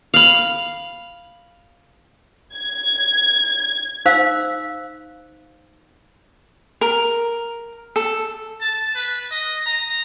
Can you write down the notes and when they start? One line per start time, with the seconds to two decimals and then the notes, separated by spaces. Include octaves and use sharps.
0.14 F5 B5
2.55 G#6
4.06 D#4 C5 F5 E6
6.81 A#4
7.96 A4
8.61 A5
8.95 B4
9.32 D#5
9.66 A#5